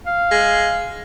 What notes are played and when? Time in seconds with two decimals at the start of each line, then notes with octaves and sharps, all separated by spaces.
0.06 F5
0.31 G#3